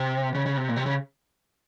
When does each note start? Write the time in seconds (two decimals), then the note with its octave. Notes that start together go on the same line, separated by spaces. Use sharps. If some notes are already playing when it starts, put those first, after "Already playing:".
Already playing: C3
0.35 C#3
0.46 C#3
0.57 C3
0.69 A#2
0.76 C3
0.86 C#3